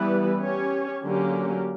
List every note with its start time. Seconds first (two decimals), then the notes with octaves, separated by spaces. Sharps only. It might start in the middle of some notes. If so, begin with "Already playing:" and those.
Already playing: E3 G3 B3 E4 B4
0.41 C#4 G4 C#5
1.04 D3 F#3 A#3 C#4 G4